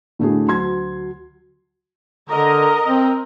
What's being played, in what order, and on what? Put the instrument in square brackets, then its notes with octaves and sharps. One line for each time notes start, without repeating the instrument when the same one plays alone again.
[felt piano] A2 D3 A3 D4 F#4 G#4
D2 F#3 C6 G#6
[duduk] D3 [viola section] A#4 D#5 A#5
[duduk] C4